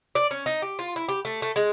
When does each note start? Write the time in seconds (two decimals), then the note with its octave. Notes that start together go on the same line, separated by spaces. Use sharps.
0.15 D5
0.31 C#4
0.46 D#4
0.62 G4
0.79 F4
0.96 E4
1.09 G4
1.25 A3
1.42 A3
1.56 G#3